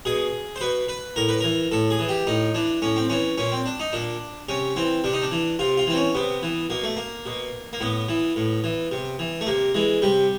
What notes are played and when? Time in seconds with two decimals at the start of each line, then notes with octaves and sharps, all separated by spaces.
0.05 B2 G#4
0.56 C5
0.61 B2 B4
0.88 B4
1.16 A2 A#4
1.28 B4
1.40 E3 A#4
1.71 A2 A4
1.90 G#4
1.99 E3
2.09 G4
2.27 A2 D#4
2.54 E3 D4
2.82 A2 C#4
2.96 C4
3.10 E3 C#4
3.38 A#2 C#4
3.52 C4
3.66 D4
3.80 D#4
3.93 A#2 D4
4.49 C3 C#4
4.76 E3 C4
5.04 C3 D4
5.13 D#4
5.22 D4
5.31 E3
5.59 C3 F4
5.77 F4
5.87 E3 C4
5.96 C#4
6.15 C3 B3
6.43 E3
6.70 B2 A#3
6.83 A3
6.97 A#3
7.26 B2
7.73 A#3
7.81 A2 B3
8.09 E3
8.36 A2
8.64 E3
8.92 C3
9.19 E3
9.41 A3
9.47 C3 A#3
9.74 E3 G#3
10.02 C3 G3